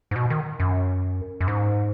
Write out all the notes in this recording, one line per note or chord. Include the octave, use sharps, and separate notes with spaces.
G#2
B2
D#3
F#2
F#2
G#2